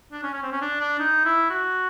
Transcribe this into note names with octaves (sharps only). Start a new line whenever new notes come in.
D4
C#4
C#4
C4
C#4
D4
D4
D#4
E4
F#4